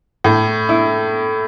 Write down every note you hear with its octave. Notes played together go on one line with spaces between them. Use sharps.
A2
E4